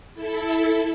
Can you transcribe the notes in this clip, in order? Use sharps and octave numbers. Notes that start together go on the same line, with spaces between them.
E4 A4